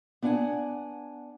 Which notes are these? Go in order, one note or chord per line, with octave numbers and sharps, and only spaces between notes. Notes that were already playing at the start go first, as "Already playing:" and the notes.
B3 D4 D5 F#5 G#5